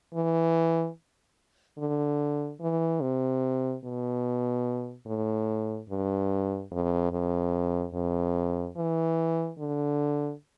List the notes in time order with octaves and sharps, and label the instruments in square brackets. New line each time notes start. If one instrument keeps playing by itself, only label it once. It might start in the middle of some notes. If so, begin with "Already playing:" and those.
[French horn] E3
D3
E3
C3
B2
A2
G2
F2
F2
F2
E3
D3